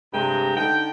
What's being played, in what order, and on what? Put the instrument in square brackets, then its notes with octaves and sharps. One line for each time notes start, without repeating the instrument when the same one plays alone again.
[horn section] G2 C3 G#3 G5 A#5
D3 D#4 G5